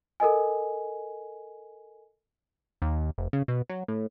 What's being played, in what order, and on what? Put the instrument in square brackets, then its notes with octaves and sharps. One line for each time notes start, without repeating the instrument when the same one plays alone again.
[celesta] A4 A#4 D#5 G#5
[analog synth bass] D#2
F1
C#3
B2
F#3
A2